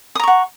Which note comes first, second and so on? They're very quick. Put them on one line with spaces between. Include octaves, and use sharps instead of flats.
D#6 A#5 C#6 F#5